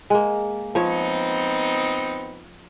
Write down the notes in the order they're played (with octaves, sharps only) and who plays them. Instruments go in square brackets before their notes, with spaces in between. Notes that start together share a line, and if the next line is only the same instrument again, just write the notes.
[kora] G#3 A#3
[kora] F3 C#5 [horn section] B3 C4 D#4